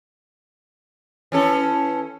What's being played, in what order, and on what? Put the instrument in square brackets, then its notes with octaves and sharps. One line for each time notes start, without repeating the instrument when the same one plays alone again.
[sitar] E3 C#4 A4